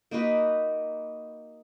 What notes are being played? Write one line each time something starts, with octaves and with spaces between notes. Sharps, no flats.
A#3 D#4 F#4 B4